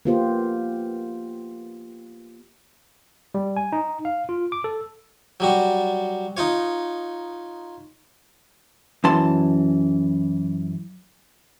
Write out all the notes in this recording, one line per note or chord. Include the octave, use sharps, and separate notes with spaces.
A#3 B3 F4 G4 C5
G3
G#5
D#4
F5
F4
D6
A4
F#3 G3 F#4
D#4 F4 C#5
F#2 E3 A5 C6